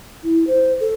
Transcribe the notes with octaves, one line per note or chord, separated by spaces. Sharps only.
E4
C5
A4